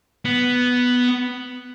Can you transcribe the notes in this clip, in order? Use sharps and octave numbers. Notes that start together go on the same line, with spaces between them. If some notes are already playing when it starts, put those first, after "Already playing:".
B3